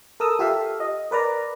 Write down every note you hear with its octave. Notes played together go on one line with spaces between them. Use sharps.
A4 A#4 D#6 E6
F4 G4 A4 E5 F5
D#5
A#4 B4 D5 A#5